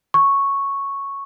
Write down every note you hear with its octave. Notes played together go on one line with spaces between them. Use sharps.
C#6